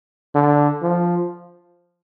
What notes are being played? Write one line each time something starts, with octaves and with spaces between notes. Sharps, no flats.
D3
F3